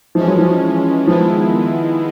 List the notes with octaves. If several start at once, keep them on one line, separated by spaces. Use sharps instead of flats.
E3 F3 G#3 C#4
F#3
F3
D#3 F3 G#3 B3 E4